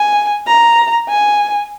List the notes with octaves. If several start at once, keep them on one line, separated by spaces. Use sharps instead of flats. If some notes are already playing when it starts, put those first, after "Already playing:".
Already playing: G#5
A#5
G#5